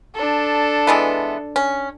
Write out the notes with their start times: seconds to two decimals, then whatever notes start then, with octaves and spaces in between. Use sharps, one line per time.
0.15 D4 A4
0.87 E3 G#3 B3
1.56 C#4